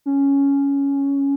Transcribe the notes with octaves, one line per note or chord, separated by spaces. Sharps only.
C#4